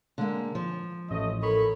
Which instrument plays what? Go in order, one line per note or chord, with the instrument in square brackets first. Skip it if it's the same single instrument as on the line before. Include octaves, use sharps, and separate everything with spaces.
[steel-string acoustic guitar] D3 G#3 A#3
F3
[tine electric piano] A1 [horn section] A3 C#4 D#5
[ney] A4 [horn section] A#4 C#5 B5